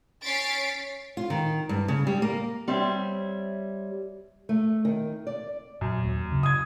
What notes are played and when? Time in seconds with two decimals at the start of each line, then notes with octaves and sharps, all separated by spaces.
0.24 C#4 C#5 A6 B6 C7 D7
1.17 F4
1.30 D#3
1.69 G2
1.88 C#3
2.07 G3
2.22 A#3
2.68 G3 C4 C#5 E5
4.49 A3
4.85 D#3
5.27 D5
5.81 F#2 A#2
6.04 D#2 A#3
6.32 C#3
6.43 D#6 G#6